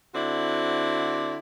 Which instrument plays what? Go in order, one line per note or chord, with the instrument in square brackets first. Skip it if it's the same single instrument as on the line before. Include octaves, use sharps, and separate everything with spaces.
[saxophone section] D3 C4 E4 F#4 D5